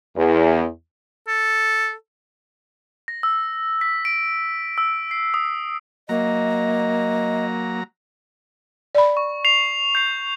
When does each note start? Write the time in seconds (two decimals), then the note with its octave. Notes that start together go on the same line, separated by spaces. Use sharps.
0.16 E2
1.28 A4
3.08 A#6
3.23 E6
3.81 B6
4.05 D7
4.78 E6
5.11 C7
5.34 D#6
6.09 F#3 A#3 D#5 A#5
8.95 D5 B5
9.17 C#6
9.45 C7 F7
9.95 G6 C7